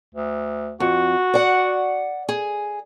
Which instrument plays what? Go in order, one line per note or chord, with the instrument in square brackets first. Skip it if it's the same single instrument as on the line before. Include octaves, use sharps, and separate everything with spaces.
[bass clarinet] D2
[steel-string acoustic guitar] F2 [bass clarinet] F#4
[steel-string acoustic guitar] D5 F#5
G#4